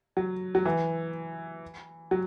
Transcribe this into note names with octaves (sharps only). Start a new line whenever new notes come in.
F#3
F#3
E3
F#3